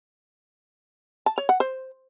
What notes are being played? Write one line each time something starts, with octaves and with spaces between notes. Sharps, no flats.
A5
C#5
F#5
C5